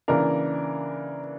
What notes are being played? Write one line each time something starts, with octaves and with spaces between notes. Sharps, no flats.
C#3 E3 A#3 D4 A#4